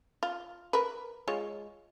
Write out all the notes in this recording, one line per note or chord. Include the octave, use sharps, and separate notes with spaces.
F4
A#4 B4
G#3 F4 C#5